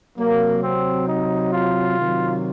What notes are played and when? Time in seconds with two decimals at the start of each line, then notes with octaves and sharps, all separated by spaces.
0.18 C3 F#3 A#3
0.63 C4
1.08 D#4
1.54 F4
1.98 C3 D#3 F#3